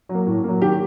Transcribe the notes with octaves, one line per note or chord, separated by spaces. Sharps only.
F#3
A#3
A2
F#3 A#3
D#3 G4